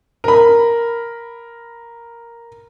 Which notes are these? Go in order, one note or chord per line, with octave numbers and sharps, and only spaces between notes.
A#4 B5